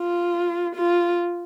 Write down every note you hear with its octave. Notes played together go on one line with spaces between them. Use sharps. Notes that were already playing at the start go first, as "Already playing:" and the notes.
Already playing: F4
F4